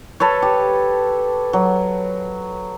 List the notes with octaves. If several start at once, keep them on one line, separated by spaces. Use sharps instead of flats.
A4 B4 C#5
G4
F#3